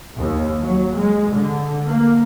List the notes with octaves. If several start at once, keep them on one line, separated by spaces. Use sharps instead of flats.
D#2
F#3
G#3
D3
A#3